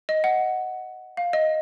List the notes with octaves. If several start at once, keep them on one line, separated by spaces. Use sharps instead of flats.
D#5
F#5
F5
D#5